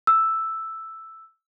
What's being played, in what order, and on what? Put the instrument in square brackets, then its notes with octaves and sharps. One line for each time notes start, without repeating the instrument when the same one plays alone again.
[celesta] E6